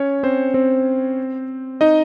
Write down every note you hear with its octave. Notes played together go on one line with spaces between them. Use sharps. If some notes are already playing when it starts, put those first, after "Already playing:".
Already playing: C#4 C#5
C4 C5
C4 C5
D#4 D#5